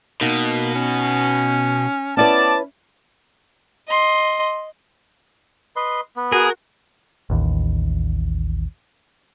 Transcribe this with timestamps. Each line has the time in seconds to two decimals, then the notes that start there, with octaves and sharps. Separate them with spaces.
0.21 B2 A#3 D#4
0.75 C#4
2.17 B3 C#4 E4 B4 D5 A5
3.87 D#5 C6
5.76 B4 D#5 C6
6.16 B3
6.32 F#4 G#4 A#4
7.30 A1 D#2